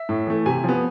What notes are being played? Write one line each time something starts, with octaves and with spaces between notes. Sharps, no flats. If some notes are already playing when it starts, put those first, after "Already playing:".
Already playing: E5
A2
E3 A3
C3 G#5
F3 B3